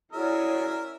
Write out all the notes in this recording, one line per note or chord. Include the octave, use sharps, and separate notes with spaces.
C#4 E4 F#4 G#4 A#4 C#5 D5 E5